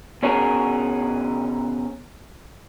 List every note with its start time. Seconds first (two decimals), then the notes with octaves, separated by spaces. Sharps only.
0.23 B2 C#4 D#4 F#4 G#4 A#4